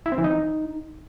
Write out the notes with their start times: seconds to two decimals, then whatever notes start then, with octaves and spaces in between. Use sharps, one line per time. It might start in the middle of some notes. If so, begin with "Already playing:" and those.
0.06 E4
0.12 C4
0.18 E3
0.24 D#4